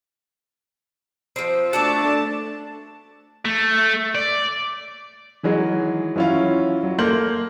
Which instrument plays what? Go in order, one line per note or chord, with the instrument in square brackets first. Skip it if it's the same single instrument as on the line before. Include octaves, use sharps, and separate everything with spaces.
[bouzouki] F3 C4
[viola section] A3 D4 A5 [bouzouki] F#4 D5 E5
[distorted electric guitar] A3
D5
[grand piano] D#3 E3 F#3 G#3
E3 F#3 C#4 E4 F4
F#3
A#3 A4 C6 G6 F#7